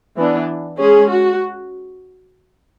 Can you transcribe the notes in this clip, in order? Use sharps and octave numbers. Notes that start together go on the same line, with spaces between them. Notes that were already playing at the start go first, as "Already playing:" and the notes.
E3 B3 D4
G#3 C#4 G#4
F#4